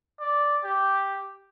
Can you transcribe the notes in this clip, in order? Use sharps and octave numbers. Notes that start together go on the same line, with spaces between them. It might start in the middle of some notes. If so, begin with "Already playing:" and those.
D5
G4